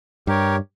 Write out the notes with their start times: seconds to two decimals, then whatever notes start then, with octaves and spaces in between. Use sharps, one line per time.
0.27 G2 G4 A#4 C#5